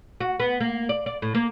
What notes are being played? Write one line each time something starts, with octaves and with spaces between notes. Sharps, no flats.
F#4
B3
A#3
D5
D5
A2
A#3